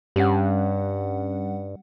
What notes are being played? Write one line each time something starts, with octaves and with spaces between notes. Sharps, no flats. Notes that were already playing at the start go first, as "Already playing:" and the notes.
G2 G3 C#4 F#5